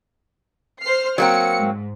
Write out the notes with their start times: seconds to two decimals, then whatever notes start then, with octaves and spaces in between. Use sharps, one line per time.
0.81 C5 F6 C7
1.18 F#3 A#3 C4 C#7
1.59 G#2